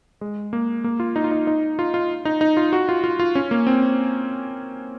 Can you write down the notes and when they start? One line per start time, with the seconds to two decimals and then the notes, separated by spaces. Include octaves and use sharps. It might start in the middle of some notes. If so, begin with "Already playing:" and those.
0.21 G#3
0.53 A#3
0.84 A#3
1.00 F4
1.16 D#4
1.24 F4
1.31 D#4
1.47 D#4
1.79 F4
1.94 F4
2.25 D#4
2.41 D#4
2.57 F4
2.73 F#4
2.89 F4
3.04 F4
3.19 F4
3.35 C#4
3.51 A#3
3.67 C4